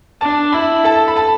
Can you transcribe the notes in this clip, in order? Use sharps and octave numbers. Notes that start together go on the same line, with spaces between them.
D4 A5
E4 B5
A4 A5
B5
A5